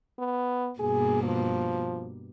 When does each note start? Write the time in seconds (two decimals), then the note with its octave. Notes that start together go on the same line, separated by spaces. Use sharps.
0.19 B3
0.80 G2 B2 A#3 G#4
1.23 F3